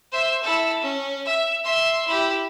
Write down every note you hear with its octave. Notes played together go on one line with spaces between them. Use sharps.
C5 E5
E4 A4
C#4
E5
E5 C6
E4 G4